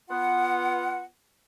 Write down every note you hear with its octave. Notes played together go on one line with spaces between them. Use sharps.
B3 F4 F#5